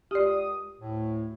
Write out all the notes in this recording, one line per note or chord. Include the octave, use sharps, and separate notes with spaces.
C#2 G4 D5 D#6
D2 A2